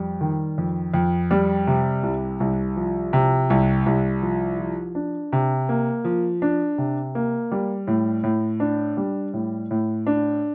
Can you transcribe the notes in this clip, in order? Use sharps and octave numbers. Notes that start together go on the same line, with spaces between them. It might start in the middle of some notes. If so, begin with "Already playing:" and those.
Already playing: F2 G3
D#3
F2
F2
G3
C3
C2
C2
F3
C3
C2
C2
F3
F3
D4
C3
A#3
F3
D4
C3
A#3
G3
A2
A2
D4
G3
A2
A2
D4